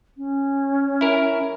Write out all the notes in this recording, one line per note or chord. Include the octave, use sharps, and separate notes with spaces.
C#4
E4 A#4